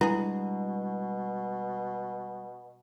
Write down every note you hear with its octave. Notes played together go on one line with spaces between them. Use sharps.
B2 G3 G#3 B3 D4 E4 G#4